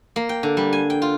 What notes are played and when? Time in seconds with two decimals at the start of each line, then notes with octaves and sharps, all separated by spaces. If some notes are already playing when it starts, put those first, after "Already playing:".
0.16 A#3
0.29 G5
0.43 D3
0.57 G3
0.73 G#5
0.90 G5
1.02 F4